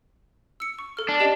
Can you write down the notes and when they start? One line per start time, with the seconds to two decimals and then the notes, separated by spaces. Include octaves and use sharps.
0.60 E6 C#7
0.79 C#6
0.97 A4 F6
1.09 D4
1.20 G4 D#5 G5